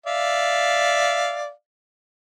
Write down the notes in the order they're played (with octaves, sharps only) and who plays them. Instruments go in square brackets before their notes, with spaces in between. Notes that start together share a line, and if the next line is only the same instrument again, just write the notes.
[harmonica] D5 E5 F5